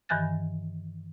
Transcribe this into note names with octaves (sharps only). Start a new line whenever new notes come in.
G2 D#3 E3 G#5 F#6 A6